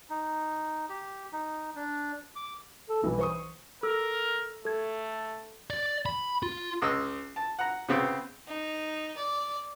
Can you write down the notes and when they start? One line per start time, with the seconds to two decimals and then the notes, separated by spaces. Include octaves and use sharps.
0.10 D#4
0.89 G4
1.33 D#4
1.76 D4
2.36 D6
2.89 A4
3.04 B1 G2 B2 E3
3.19 C5 C#6 D#6
3.83 A4 A#4 E6
4.65 A3 A4 G#6
5.70 D5
6.06 B5
6.43 F4
6.82 C#2 D#5 E6
7.36 A5
7.59 F#5 A#5
7.89 C#3 B3 C4
8.47 D#4
9.16 D5